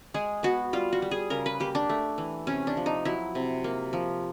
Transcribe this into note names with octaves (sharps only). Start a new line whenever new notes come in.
G#3 G#4
B3 F#4
G3 F4
F#4
G3
G#4
C#3 A#4
B4
A#3 G4
D4
A3
E3
C3 C#4
D4
F3
D#4
F#3 E4
C3
A#3
F3